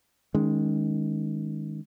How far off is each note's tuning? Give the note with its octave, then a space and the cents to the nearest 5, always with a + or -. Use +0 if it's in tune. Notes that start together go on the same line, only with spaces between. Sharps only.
D#3 +0 G#3 +0 C#4 +20